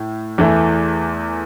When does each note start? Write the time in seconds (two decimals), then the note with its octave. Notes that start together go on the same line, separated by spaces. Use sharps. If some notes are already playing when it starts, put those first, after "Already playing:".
Already playing: A2
0.38 E2 E3 A3